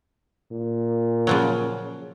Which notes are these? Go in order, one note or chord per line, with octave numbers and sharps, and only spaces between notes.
A#2
C#3 F3 F#3